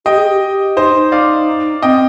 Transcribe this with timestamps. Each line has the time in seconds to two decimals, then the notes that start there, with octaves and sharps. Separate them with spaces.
0.06 G4 D#5 G5
0.17 G#4
0.30 G4
0.41 G4
0.77 D#4 C5 D#5
0.94 D#4
1.12 D5 F5
1.82 C4 D#5 G5